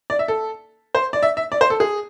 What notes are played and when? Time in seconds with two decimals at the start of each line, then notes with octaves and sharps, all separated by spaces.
0.10 D5
0.19 E5
0.28 A4
0.95 C5
1.13 D5
1.23 E5
1.37 E5
1.52 D5
1.61 C5
1.70 A4
1.80 G#4